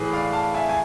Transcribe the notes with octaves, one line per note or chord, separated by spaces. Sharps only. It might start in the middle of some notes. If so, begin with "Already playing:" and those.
Already playing: A2 E3 G#4 B4
D5 F5
F5 A5
E5 G#5
G#5